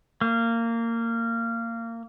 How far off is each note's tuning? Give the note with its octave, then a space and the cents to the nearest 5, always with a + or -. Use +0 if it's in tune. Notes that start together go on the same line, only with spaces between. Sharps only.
A#3 -20